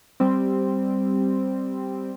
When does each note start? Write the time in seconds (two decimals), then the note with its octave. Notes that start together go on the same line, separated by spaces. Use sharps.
0.20 G3 C4